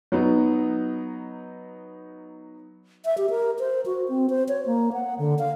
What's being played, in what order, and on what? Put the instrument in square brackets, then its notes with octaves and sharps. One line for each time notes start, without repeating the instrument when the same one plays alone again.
[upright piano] F#3 B3 D#4
[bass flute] E5
G4
A#4
C5
F#4
C4
C5
C#5
A#3
F#5
D3
F5